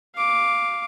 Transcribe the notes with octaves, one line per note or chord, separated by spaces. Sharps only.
F5 D6